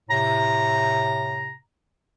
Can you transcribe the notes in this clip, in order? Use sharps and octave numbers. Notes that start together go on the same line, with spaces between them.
A2 C3 A#5